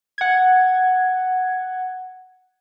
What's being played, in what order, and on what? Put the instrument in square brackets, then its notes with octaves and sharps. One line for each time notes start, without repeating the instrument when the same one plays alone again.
[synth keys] F#5 G#6